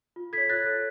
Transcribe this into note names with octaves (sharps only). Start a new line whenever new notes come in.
F4
A4 C#5 G#6 B6
F4 F#6 A6
A4 C#5